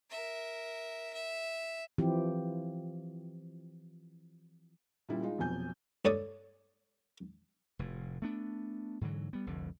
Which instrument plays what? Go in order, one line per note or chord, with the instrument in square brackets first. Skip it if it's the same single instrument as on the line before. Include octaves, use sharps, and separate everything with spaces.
[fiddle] A#4 E5
E5
[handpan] E3 F3 C4 E4 G4
[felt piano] A#2 C#3 G3 E4
G#3 D#4 F4
F1 F2 B2 F#3 G#5 G6
[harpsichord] G2 A4 C#5 D5 D#6
[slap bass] F1 A2
A3 B3 D4
G#2 D3 E3 F#3
G3 B3
F1 C2 F2 D3